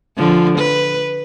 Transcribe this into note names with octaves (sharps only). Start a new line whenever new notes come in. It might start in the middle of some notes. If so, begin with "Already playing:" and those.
D3 F3
B4